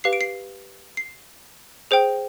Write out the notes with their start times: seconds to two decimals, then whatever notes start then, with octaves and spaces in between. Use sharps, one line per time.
0.04 G4 B4 F5 C7
0.13 D7
0.21 C7
0.97 C7
1.91 G#4 C5 G5